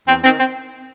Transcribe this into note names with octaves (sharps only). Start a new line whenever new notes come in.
E2 C4
D#3 C4
C4